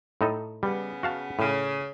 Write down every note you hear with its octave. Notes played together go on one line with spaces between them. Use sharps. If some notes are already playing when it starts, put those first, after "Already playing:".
A2 D#4 A4
C#3 G3 B3
F#4 F5 A5
A2 C#3